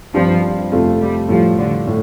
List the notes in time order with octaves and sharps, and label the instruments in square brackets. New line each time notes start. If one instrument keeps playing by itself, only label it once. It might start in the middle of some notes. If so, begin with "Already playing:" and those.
[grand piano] G2 G3 C4 F4 [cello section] F3
[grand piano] F2 C3 A3 F4
[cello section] G3
[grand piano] A2 G3 F4 [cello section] F3
[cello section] D3
[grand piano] A2